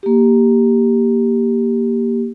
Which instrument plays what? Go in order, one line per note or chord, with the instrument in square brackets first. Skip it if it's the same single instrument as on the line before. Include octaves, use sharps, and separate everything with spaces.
[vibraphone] A#3 G4